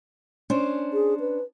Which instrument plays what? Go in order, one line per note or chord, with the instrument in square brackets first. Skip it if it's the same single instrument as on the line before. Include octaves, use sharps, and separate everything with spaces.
[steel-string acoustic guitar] C#4 D4 C5
[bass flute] G#4
B4